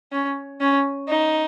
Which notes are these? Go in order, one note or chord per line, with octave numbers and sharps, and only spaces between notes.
C#4
C#4
D#4